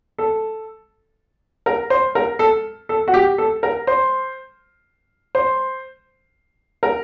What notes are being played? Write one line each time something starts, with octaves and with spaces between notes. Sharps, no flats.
A4
A#4
C5
A#4
A4
A4
F#4
G4
A4
A#4
C5
C5
A#4